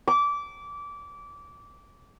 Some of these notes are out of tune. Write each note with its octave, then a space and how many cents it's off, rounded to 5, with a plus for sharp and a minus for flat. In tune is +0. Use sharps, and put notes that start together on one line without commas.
D6 -20